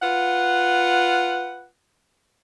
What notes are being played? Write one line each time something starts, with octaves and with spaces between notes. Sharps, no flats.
F4 B4 F#5